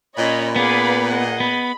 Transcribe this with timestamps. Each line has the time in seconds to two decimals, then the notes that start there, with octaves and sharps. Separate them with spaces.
0.18 A#2 C#4 F4 C#5 D#5 B5
0.56 B3 G#4 B4 D5 F5 B5
1.09 G#4 D#5 F#5
1.40 B3 B5